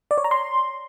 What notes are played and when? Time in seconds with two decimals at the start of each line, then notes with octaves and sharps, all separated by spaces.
0.11 D5
0.18 C#5
0.24 A#5
0.31 C6